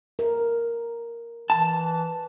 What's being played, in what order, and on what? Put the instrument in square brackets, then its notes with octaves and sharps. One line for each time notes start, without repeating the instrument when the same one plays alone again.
[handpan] A#4
[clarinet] E3 [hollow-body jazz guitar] A5